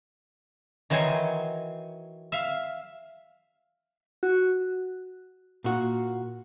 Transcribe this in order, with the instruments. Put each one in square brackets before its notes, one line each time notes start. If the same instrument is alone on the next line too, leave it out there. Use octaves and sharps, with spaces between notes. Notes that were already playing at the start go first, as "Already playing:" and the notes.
[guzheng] D#3 E3 F#3 D#4 G#5 C6
E5 F5
[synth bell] F#4
[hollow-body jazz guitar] A#2 F#4